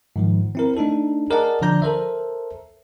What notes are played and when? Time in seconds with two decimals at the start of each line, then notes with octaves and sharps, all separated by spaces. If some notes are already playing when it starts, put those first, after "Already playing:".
0.16 G#2 D#3 F3
0.55 C4 E4 A#4
0.77 A3 D4 D#4 A4
1.30 G#4 A#4 D5 D#5 F#5 A5
1.62 D3 F3 D5 A#5 G6
1.82 A4 A#4 C5 E5